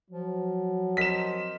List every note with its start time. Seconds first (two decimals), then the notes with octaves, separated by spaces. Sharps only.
0.10 F3 F#3
0.97 C4 A#4 D#5 B6 E7